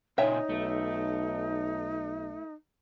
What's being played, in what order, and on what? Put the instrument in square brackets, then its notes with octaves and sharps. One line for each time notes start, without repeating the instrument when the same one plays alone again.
[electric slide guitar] A#2 C#3 G#5 [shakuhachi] D#4 [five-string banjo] C#5 E5 G5
[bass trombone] B1 [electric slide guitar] A3